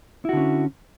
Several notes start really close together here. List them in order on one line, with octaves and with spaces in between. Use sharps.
E4 F#4 D3 C#4